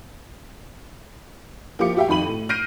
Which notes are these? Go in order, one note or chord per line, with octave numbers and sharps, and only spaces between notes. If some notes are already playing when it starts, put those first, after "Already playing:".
F3 A#3 E4 G4 D6 C#7
F#4 G4 E5 F5 G5
F2 D#3 F#4 B5 D#7 F#7
A2
F6 G6 A#6 C7 D7 D#7